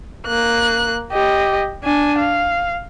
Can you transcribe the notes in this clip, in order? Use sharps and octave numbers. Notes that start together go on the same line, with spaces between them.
A#3 F#6
G4 D#5
D4 G#5
F5